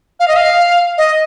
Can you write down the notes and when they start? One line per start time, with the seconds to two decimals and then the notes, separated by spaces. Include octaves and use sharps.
0.20 F5
0.28 D#5
0.36 F5
0.98 D#5